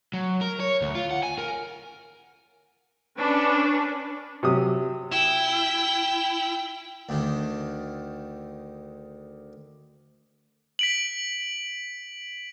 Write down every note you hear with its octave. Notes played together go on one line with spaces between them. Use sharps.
F#3
A#4
C#5
D2
F4
F#5
G#5
A#4
C#4 D4 B4
C3 F#3 D#6
E4 G5
D2 D3 D#3
B6 D7 F#7